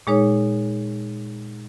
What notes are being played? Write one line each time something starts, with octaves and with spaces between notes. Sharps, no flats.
A#2 G#3 D#4 G#4 C#5